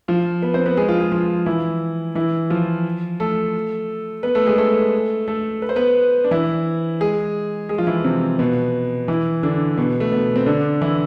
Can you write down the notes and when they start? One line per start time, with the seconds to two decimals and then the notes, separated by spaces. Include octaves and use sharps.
0.08 F3 F4
0.42 B3 B4
0.54 C4 C5
0.66 B3 B4
0.77 G#3 G#4
0.89 F3 F4
1.00 G#3 G#4
1.12 F3 F4
1.46 E3 E4
2.15 E3 E4
2.50 F3 F4
3.20 A3 A4
4.23 B3 B4
4.35 A3 A4
4.46 G#3 G#4
4.58 A3 A4
5.28 A3 A4
5.62 B4
5.69 C5
5.76 B3 B4
6.24 D4
6.31 E3 E4
7.00 G#3 G#4
7.69 G#3 G#4
7.78 F3 F4
7.87 E3 E4
8.04 C3 C4
8.39 B2 B3
9.08 E3 E4
9.43 D3 D4
9.77 B2 B3
10.00 A3
10.12 B2 B3
10.36 C4
10.46 D3 D4
10.81 E3 E4